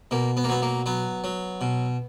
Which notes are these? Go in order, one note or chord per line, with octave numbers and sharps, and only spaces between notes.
B2 A#3
B3
A#3
F#3 B3
A#3
F#3 B3
F#3
B2